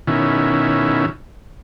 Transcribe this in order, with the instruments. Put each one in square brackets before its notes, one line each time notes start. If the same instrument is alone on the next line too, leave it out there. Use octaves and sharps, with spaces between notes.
[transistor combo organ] B2 D#3 C#4 E4